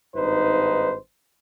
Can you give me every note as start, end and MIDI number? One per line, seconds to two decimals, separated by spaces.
0.16 0.95 32
0.16 0.95 43
0.16 0.95 63
0.16 0.95 71
0.16 0.95 72